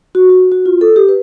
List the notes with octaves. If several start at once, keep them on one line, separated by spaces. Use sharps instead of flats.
F#4
F#4
F#4
F4
A4
G4
B4